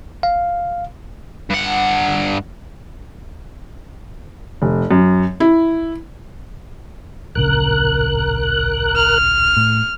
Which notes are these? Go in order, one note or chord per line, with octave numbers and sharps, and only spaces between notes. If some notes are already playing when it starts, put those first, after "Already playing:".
F5
G2 F#5
F1
F#2
E4
D1 A#1 C#3 A#4 F#6
F6
A2